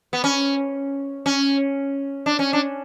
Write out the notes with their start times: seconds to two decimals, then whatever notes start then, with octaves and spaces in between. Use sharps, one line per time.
0.13 B3
0.24 C#4
1.26 C#4
2.26 D4
2.39 C#4
2.53 D4